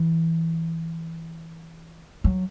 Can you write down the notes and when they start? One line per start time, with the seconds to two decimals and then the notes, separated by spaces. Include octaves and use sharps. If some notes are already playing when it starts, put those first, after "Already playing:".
Already playing: E3
2.24 F#3